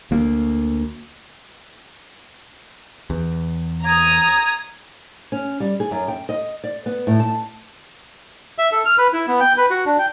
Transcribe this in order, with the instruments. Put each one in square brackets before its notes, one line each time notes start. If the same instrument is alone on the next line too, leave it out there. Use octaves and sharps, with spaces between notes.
[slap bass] D2 A#3
[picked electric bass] E2
[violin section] A#5 D#6 [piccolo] G#6
[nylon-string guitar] C#4
G3
G#4
F#2
G5
D#5
D5
B3
A2
A5
[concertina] E5
A4
F6
B4
E4
B3
G5
B4
F#4
D4
G5